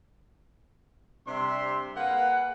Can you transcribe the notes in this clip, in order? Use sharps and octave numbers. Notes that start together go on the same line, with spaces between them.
C3 G3 D4 E5 C6
A#3 G#4 B4 F5 F#5